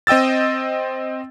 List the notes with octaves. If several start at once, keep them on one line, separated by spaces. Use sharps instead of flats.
C4 D#5 G5 E6 A6